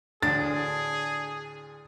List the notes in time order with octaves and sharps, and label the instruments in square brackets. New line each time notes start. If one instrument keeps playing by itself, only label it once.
[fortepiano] D2 A2 [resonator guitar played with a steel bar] D4 [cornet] G#4 [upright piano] A6